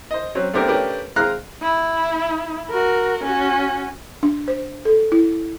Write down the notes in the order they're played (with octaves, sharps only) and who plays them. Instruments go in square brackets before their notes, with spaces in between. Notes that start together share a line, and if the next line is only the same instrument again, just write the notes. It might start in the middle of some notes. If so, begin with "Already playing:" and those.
[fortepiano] C5 D#5
F#3 C4 C#4
A3 B3 C4 D4 G4 A#4
A3 C#4 D4 G4 A#4 B4
G#3 C4 F5 A#5 F6 F#6
[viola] E4
F#4 A#4
C#4 F#4
[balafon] D4
C5
A4
E4